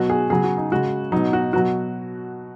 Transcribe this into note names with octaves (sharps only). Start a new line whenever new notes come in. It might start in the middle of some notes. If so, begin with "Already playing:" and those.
Already playing: B2 F#3 F#4
G#4
C#3 F#3 G#4
F#4
D#4
C#3 G#3 F#4
B2 F#3 D#4
F#4
B2 F#3 F#4